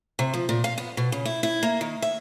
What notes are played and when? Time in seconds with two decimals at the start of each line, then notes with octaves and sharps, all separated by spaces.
0.19 C3
0.34 F3
0.49 A#2
0.64 F5
0.78 B3
0.97 B2
1.12 C#3
1.25 E4
1.43 E4
1.63 A#3
1.81 D#3
2.02 E5